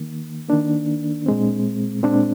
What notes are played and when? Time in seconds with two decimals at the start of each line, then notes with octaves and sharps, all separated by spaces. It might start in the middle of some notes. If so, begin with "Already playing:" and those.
Already playing: D#3 A#3
0.49 D#3 A#3 D4
1.26 A#2 G#3 C4
2.03 A#2 G#3 C4 D4